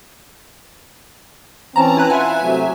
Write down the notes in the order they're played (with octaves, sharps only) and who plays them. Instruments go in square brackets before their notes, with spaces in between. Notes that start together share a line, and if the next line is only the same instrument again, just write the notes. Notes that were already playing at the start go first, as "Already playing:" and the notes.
[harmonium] E3 C4 C#4 [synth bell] A5 A#5
[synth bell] E4 B4 F#6
[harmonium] E4 F4 F#5 [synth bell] E5 G#5
[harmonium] C3 F#3 A3